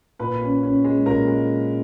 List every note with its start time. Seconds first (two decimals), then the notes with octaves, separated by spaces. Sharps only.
0.19 A#2 B4 B5
0.41 C#4
0.63 C#4
0.84 G#3
1.06 A#2 A#4 A#5
1.27 G#3